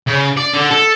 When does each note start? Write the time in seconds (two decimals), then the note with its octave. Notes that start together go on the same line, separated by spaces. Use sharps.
0.07 C#3
0.37 D5
0.54 D3
0.70 A4